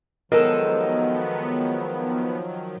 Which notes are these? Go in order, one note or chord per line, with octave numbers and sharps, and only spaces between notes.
D#3 F3 F#3 G#3 B3 D#4 A4 A#4